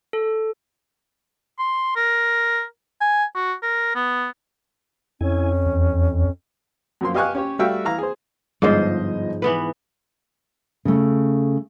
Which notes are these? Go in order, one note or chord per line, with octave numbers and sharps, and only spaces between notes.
A4
C6
A#4
G#5
F#4
A#4
B3
F2 C#4 E4 G#5
E2
F#2 F3 A#3 C6
G4 D#5 F5 G#5 C#6 F#6
C#4 G4 C#5
G3 A3 F#4 E5 F5 G5
E3 F5 A#5
G#4 C5
G1 G#2 F3 F4 C5 D#5
E3 B3 B4
C#3 A3